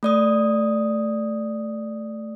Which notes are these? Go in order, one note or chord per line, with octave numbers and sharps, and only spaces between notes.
A3 D5 D#6